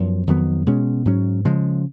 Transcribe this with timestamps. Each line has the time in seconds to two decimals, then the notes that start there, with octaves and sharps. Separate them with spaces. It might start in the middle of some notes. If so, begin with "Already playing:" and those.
Already playing: F#2 F3 B3
0.27 F2 D#3 F#3 B3
0.66 B2 G#3 C#4
1.05 G#2 F#3 C#4
1.45 C#3 F3 G#3